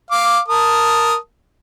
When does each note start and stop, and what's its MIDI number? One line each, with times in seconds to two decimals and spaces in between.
0.11 0.40 77
0.11 0.40 86
0.48 1.16 70
0.48 1.16 81
0.48 1.16 87